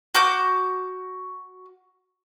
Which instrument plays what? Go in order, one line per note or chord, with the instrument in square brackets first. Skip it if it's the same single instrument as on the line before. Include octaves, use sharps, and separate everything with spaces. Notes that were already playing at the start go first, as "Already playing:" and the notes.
[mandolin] F#4 D6 G6